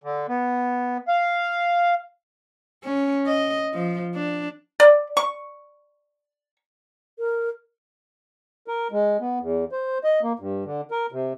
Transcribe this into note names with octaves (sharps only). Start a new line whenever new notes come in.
D3
B3
F5
C#4
D#5
F3
D4
D5
C#6
A#4
A#4
G#3
B3
E2
C5
D#5
A#3
G2
D3
A#4
C3